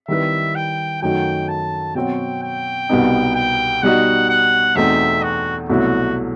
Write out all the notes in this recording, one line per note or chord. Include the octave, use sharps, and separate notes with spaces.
D#3 G3 C4 E4 B4 E5
G5
F#2 D#3 A3 D#4 F#4 G5
A5
B2 F#3 C4 F#4 G5
G5
C2 B2 G3 B3 D#4
G5
B2 G3 D#4 F#4 F#5
F#5
E2 B2 A3 C4 D#4 E5
F#4
C2 B2 F#3 A3 E4 F#4